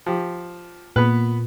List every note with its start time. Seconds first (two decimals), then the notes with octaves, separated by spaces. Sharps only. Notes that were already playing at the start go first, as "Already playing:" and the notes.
0.06 F3 G4
0.96 A#2 B3 B4